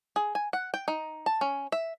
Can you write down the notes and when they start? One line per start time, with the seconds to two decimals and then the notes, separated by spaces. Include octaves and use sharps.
0.16 G#4
0.35 G#5
0.53 F#5
0.74 G5
0.88 D#4
1.26 A5
1.41 C#4
1.72 E5